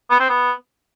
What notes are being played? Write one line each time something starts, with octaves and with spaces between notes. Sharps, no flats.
B3
C4
B3